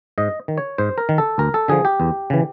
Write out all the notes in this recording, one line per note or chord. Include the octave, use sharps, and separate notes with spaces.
G#2 D#5
D#3
C#5
G#2 C5
A#4
D#3
A4
D2 A#4
A4
D3 F3 G#4
G4
E2
C#3 E3